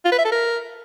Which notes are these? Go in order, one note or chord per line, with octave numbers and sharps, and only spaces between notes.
F4
B4
E5
A4
A#4